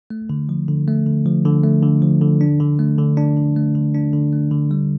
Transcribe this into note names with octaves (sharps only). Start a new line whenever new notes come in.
A3
D3
F3
D3
A3
D3
F3
D3
A3
D3
F3
D3
D4
D3
A3
D3
D4
D3
A3
D3
D4
D3
A3
D3
G3